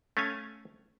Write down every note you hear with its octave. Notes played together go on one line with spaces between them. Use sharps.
A3 C#4 F5 G#5